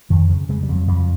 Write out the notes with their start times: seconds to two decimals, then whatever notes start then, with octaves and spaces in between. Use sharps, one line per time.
0.10 F2 D#3
0.30 C#3
0.49 C#3 G#3
0.63 G3
0.69 F2
0.75 F#3
0.88 F2 F3